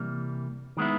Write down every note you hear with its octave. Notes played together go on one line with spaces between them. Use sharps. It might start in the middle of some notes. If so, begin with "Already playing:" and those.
Already playing: C3 E3 G3 A#3
D#3 G#3 B3 E4